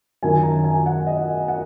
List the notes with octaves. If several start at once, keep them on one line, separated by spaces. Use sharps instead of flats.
F#2 D#3 F#3 G#5
A#5
G#5
F#5
D#5
F#5